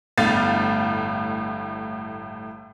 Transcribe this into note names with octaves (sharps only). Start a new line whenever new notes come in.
G1 A2 F5 A6